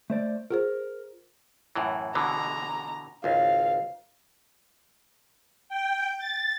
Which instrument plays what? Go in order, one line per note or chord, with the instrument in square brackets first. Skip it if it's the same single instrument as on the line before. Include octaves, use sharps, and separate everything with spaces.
[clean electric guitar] A3 C5 D5
[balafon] F4 G#4 C5 [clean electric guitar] A#4
[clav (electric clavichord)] F#2 A2 E3
[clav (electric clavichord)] B2 D3 E3 [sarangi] A#5
[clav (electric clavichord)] G#1 C#2 [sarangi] F5
[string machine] G5
A6